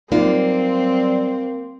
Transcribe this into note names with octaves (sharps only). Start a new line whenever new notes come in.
F#3 G3 A#3 C4 D#4 F4 D5